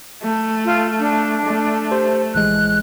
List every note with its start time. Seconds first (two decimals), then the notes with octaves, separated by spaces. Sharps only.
0.23 A3
0.65 F4
0.99 D4
1.46 A3
1.91 G4 C5
2.34 A#1 E3 G#3 F#6